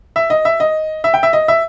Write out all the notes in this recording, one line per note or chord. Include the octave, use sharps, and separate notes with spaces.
E5
D#5
E5
D#5
E5
G5
E5
D#5
E5